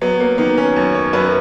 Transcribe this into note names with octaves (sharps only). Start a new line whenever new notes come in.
F#3 B3
A#3
D#3 B3
C#4
F#2
C#5
F#2 B4